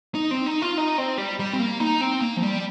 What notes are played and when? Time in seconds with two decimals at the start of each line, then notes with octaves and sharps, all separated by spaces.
0.15 D#4
0.31 C4
0.46 D#4
0.62 F4
0.77 D#4
0.98 C4
1.18 G3
1.39 G3
1.53 C4
1.60 A#3
1.80 D#4
2.01 C4
2.21 A#3
2.37 F3
2.43 G3